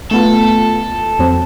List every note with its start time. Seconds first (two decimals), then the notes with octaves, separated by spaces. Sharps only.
0.11 A3 B3 F4 A4
1.19 F2 F#3 C4